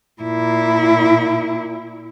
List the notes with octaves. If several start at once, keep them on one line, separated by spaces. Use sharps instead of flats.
A#2 E4